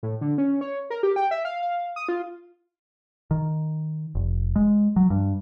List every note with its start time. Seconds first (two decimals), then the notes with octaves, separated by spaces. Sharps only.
0.03 A2
0.21 D3
0.38 C#4
0.61 C#5
0.90 A#4
1.03 G4
1.16 G5
1.31 E5
1.45 F5
1.62 F5
1.96 D#6
2.09 F4
3.31 D#3
4.15 F1
4.56 G#3
4.96 F#3
5.10 G2